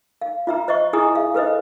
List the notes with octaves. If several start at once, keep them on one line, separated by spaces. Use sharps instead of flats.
F5
F4 E5 A#5
C5 D#5 E5 C#6
E4 G#4 G#5 A#5 D#6
E5 F5
A4 B4 C5 D#5